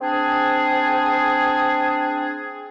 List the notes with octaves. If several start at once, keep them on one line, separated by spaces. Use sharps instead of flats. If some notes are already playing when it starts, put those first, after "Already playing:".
C4 D4 G#4